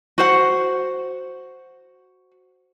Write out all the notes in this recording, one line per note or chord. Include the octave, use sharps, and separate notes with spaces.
F#4 C5 F#5